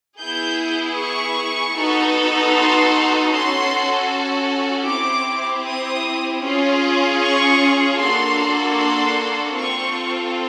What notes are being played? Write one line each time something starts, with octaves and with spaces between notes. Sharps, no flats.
B3 E4 G#4 G6
C#6
B3 D#4 F#4 A4
C6
C#4 F#4 A4 C6
C4 E4 G4 D6
D#6
C#4 F4 G#4
C#6
A#3 D4 F#4 A4 C6
C6
C4 F4 A4 C#6